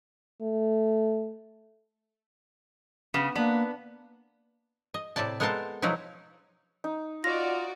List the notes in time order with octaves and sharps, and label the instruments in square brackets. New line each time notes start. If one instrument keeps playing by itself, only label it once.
[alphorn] A3
[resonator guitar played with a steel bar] C#3 [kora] B3
[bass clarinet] A#3 [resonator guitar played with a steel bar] B3 [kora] D4
[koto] D#5
A2 C3 E4 D5 A5
G#3 B3 A4 A#4 C5 A5
B2 F3 F#3 D#4 E4
[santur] D#4
[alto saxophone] F4 [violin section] F#4 D5 D#5 [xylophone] A#6